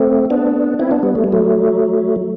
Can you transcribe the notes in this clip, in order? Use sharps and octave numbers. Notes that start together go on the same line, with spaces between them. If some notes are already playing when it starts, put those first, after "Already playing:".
Already playing: A3 C4
B3 D4
C4 E4
B3 D4
G3 B3
A3
G3
F#3 A3